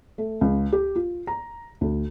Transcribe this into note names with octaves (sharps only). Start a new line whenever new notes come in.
A3
C#2
G4
F4
A#5
D2